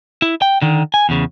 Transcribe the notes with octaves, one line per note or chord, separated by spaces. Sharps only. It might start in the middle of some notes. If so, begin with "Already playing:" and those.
E4
G5
D3 D#3
G#5
E2 C#3